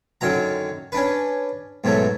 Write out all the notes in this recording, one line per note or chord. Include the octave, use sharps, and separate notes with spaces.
F#2 D3 D#3 F#3 A#5
C#4 D4 B4
G#2 B2 F#3 A3